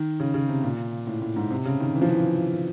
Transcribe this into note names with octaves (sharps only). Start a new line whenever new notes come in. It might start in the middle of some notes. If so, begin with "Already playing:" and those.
Already playing: D#3
C#3
C#3
C3
A#2
A2
A2
G#2
C3
C#3
D#3
E3
F3
E3